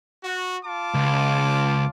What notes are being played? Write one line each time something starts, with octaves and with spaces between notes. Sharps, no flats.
F#4
F4 A5 D6
C#2